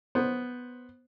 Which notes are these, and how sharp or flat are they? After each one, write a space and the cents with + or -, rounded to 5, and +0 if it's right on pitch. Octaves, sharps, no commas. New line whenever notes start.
B3 +0 C5 +5